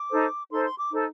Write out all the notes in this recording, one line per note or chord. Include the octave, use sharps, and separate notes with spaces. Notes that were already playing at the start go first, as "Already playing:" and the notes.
Already playing: D6
D#4 A4 C5
D#4 A4 C5 C6
C6
D6
D#4 A4 C5